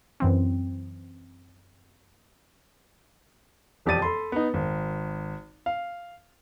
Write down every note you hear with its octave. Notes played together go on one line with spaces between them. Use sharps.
F#2 E3 C4
E1 F2 G4 D5 A6 D#7
A4 B5 C6
B3 D#4
G#1
F5